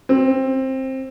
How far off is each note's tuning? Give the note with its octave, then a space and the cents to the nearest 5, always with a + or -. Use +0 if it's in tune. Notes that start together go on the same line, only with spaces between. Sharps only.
C4 +15